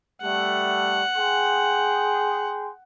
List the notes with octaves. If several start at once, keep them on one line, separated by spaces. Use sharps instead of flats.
G3 A3 F#5
G#4 G5 C6